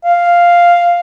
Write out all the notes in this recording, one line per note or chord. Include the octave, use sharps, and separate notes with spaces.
F5